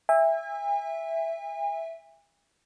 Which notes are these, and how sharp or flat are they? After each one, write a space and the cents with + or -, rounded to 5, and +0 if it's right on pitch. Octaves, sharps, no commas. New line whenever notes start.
E5 +0 G#5 -40